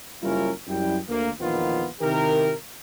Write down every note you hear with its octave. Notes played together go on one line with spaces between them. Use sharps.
F#1 G3 C#4 E4 F4 A#4
F#2 G3 E4 G5
D2 A#3
A#1 E2 D#3 F3 B3 F4
C3 D#3 E4 G4 A#4